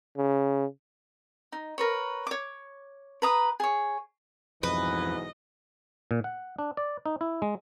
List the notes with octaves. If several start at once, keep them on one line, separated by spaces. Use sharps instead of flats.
C#3
D#4
A#4 B4 C#5
C#5 D6
B4 A#5 D#6
G#4 C#5
B1 F2 G#2 E3 B4 D#5
A#2
F#5
D4
D5
D#4
E4
G#3